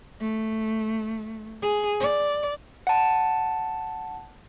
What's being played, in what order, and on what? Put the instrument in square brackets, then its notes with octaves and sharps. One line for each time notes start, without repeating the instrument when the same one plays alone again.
[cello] A3
G#4
D5
[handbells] F#5 A5